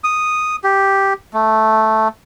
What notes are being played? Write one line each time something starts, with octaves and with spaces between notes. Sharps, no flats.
D#6
G4
A3